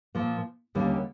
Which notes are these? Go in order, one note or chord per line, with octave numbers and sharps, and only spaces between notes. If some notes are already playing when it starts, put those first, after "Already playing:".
A#2 F3 A#3
D#2 D3 G3 A#3 C#4